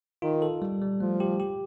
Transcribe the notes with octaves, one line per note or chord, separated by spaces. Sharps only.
D#3 F4
A4
G3
G3
F3 A3
G4
G4